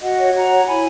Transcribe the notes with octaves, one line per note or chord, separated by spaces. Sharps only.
F#4 D#5 F#5
C#5
F#4 F#5 A#5
C#5
E4 G#5 B5